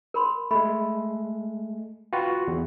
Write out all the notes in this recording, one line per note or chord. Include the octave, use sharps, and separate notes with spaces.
A#4 B5 C6
G#3 A3 B5
F4 F#4 B4 G5
E2